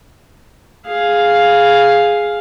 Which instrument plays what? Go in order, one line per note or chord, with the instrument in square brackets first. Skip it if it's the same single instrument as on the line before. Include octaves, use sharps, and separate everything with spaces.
[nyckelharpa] G#4 F5